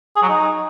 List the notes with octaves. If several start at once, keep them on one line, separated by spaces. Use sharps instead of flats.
G#4
F#3
D#4